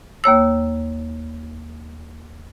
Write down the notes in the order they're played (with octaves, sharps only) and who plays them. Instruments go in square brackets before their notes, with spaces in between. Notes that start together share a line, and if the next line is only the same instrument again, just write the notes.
[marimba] D#2 A#3 C#5 E6